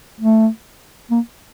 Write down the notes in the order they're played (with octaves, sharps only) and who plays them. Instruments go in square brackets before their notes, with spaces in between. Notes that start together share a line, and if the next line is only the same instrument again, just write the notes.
[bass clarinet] A3
A#3